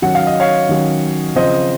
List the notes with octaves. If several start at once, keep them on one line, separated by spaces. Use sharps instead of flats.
D#3 F#3 C#4 F#5
F5
D#5
C#5 F5
D#3 F#3 C#4
C#3 F3 C4 C5 D#5